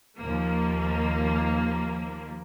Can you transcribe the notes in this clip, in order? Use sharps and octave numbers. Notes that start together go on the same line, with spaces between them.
D#2 F3 A#3